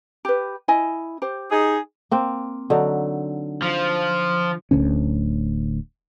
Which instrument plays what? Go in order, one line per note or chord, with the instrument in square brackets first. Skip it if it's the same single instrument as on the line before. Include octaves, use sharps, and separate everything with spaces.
[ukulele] G4 B4
E4 D#5 G#5
G4 C5
[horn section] D#4 G#4
[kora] A#3 C4
D3 F#3 D#4
[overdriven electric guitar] F3
[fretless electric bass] D1 D2 D3 C#4